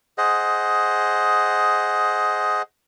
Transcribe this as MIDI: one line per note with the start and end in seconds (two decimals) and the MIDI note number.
0.18 2.62 68
0.18 2.62 72
0.18 2.62 75
0.18 2.62 78